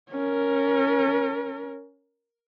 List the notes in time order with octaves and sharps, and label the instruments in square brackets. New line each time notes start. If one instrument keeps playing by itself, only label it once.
[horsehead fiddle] C#4 A#4